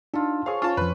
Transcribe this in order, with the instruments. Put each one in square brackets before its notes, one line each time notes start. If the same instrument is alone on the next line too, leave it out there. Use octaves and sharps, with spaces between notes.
[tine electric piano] D4 D#4 [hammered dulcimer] F4 A4
[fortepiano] G#4 F5 [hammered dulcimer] A4 C#5 [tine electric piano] C5
[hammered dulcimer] C#4 [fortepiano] F4 A5
[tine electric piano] F2 F3 [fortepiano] B4